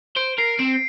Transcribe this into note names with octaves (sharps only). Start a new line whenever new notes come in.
C5 D7
A#4 C7
C4 D7